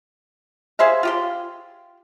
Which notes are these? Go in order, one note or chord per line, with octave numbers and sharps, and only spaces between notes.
G#4 C5 E5 F5
F4 G4 C6